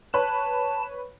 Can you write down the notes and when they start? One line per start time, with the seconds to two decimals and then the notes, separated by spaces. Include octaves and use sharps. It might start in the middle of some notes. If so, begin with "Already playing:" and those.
0.14 B4 C#5 A5 F#6